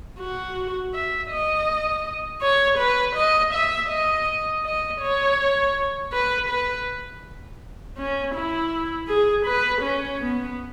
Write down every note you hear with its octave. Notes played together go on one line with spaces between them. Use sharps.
F#4
E5
D#5
C#5
B4
D#5
E5
D#5
D#5
C#5
B4
B4
C#4
E4
G#4
B4
C#4
B3